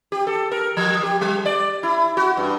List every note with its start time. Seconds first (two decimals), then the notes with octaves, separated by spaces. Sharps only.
0.12 G4
0.27 A4
0.51 A#4
0.77 F3
1.03 G4
1.21 G3
1.46 D5
1.83 E4
2.17 F#4
2.37 G2